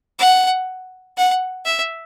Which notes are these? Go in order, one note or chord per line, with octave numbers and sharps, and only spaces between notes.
F#5
F#5
E5